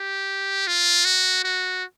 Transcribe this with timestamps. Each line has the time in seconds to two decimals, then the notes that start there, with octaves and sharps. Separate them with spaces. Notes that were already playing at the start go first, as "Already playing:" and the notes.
Already playing: G4
0.67 F4
1.05 F#4
1.44 F#4